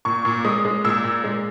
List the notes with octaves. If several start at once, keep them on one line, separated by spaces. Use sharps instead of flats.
A#2 C#6
A#2
G#3 D#6
G#3
A#2 E6
A#2
G#3